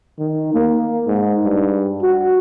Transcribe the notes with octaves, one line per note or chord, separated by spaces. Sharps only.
D#3
A#3
G#2
G2
F#4